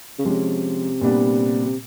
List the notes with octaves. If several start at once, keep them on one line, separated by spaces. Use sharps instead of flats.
C#3
C3 F3 G#3 C#4
A#2 G3 B3 D4
C3